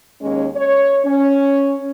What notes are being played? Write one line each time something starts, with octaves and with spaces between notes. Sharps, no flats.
D#2 G#3 C#4
C#5
C#4